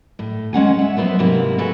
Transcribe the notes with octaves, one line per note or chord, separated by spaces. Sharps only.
A2
G#3 C#4 F#5 G#5
E5 F#5
F#3 B3 F4 B4 C5 E5
G#2 C3 A#3 E4
F#4 A4 B4 G#5